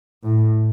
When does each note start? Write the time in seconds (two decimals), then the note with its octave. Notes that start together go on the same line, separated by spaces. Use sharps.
0.23 A2